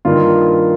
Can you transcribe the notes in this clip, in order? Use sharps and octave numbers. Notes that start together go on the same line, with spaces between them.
G2 D#3 A#3 F4